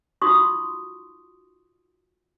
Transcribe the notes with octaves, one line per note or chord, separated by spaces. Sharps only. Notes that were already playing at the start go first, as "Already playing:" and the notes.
D#4 F4 F#4 C6 C#6 D#6